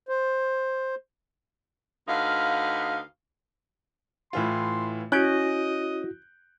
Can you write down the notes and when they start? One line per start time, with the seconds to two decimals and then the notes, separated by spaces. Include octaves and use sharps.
0.09 C5
2.08 D2 D#4 B4 F5
4.33 A2 E3 F4 C6
5.12 C#4 E4 F#4 D#5 F#6 G6 D7